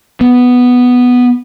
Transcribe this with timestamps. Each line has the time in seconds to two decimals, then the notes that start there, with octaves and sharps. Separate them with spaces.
0.21 B3